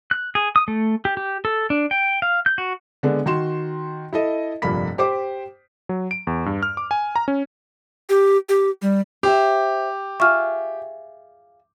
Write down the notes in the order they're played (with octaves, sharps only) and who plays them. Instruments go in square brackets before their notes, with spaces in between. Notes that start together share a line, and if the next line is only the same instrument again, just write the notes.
[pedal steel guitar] F#6
G#4
D#6
A3
G4
G4
A4
D4
G5
F5
G6
F#4
[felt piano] D3 G#3 B3 D4
D#3 F#4 C6 E7
E4 A4 D#5
F1 G2 A#2 A#3 B5 B6
G4 C5 D6
[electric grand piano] F#3
D7
E2
G2
F6
D6
G#5
A#5
C#4
[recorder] G4
G4
G3
[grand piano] G4 [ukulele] C5 E5
[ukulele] F4 G#4 E5 [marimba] C#6 F6